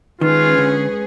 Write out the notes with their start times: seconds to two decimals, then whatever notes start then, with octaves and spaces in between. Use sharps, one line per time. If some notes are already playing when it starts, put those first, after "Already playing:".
0.21 D#3 G#3 C#4 F4 G#4 B4
0.58 D3